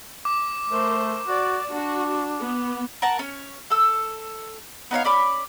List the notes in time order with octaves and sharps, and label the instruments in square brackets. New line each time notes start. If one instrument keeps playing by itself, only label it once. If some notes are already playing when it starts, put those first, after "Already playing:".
[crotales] D6
[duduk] A3 [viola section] A#4 C5
[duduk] F#4 [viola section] D5
[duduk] D4 [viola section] F#4
[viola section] B3
[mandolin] A#4 F#5 A5 A#5
C#4 C#5
A4 E6
B3 D#4 C#5 F5
C#4 D5 B5 D6